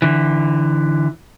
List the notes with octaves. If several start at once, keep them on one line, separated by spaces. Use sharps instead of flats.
D3 E3